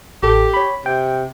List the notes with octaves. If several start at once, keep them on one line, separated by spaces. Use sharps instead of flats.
A1 G4 A4
C#5 B5
C3 G5